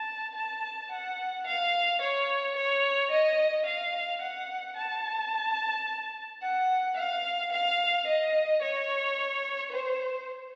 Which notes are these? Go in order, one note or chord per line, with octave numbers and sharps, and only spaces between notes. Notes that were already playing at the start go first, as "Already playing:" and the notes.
Already playing: A5
A5
F#5
F5
C#5
C#5
D#5
F5
F#5
A5
F#5
F5
F5
D#5
C#5
C5